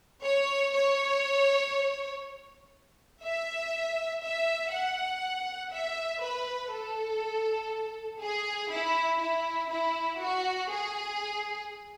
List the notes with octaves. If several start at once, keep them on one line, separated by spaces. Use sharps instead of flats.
C#5
C#5
E5
E5
F#5
E5
B4
A4
G#4
E4
E4
E4
F#4
G#4